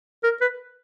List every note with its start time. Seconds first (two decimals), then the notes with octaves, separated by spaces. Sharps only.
0.24 A#4
0.41 B4